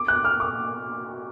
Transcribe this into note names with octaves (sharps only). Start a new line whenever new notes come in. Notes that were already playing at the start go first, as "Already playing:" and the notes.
Already playing: D6
F#6
F6
D6